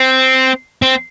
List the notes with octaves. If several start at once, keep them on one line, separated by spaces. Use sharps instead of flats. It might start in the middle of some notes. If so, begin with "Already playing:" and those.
Already playing: C4
C4